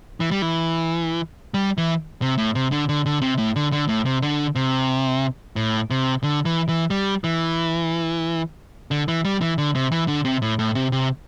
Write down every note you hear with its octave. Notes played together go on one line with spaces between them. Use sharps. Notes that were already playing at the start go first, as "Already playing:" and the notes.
E3
G3
E3
G3
E3
C3
A2
C3
D3
D3
D3
C3
A2
D3
D3
A2
C3
D3
C3
A2
C3
D3
E3
E3
G3
E3
D3
E3
G3
E3
D3
C3
E3
D3
C3
A2
A2
C3
C3